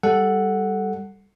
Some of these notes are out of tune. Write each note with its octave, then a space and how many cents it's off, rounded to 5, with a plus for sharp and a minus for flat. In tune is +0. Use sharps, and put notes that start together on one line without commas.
G3 +0 A4 +0 F#5 +0